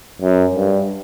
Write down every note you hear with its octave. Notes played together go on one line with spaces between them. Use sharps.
F#2
G2